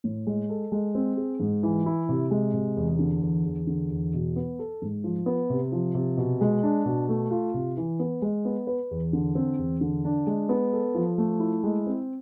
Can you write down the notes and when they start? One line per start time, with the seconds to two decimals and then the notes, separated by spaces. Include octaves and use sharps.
0.04 A2
0.27 G#3
0.49 A4
0.72 G#3
0.95 C4
1.17 G#4
1.40 G#2
1.63 E3
1.86 E4
2.09 C3
2.31 G#3
2.53 C3
2.77 E2
2.99 D3
3.22 E2
3.45 E2
3.67 D3
3.91 E2
4.14 B2
4.36 B3
4.59 A4
4.82 G#2
5.04 F3
5.26 B3
5.50 C3
5.72 F3
5.94 C3
6.17 B2
6.41 G#3
6.63 D4
6.85 B2
7.09 A3
7.31 F4
7.54 C3
7.77 E3
7.99 B3
8.22 G#3
8.45 B3
8.67 B4
8.91 E2
9.13 D3
9.35 C4
9.58 E2
9.81 D3
10.05 D4
10.27 G#3
10.49 B3
10.73 A4
10.95 F3
11.18 A3
11.40 E4
11.64 G#3
11.87 C4